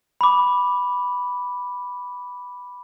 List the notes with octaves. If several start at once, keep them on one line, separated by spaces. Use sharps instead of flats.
B5 D6